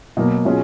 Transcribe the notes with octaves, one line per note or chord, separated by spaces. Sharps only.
B2 F#3 A#3
B2 F#3 C#4 F4 G#4